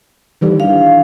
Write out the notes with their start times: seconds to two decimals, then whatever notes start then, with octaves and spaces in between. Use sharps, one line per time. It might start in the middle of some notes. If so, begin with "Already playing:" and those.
0.41 D#3 E3 G3
0.60 D4 F5